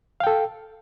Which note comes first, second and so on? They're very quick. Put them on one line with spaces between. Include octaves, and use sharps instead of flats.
F5 G5 A4